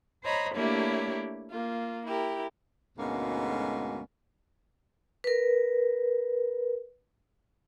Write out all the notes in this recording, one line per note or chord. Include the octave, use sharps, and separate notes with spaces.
C5 C#5 D#5 A#5 B5
A3 A#3 D4 E4 G4 C#5
A#3 F4
E4 G4 A#4
D2 G#2 B2 G#3 A#3 C#4
A#4 B4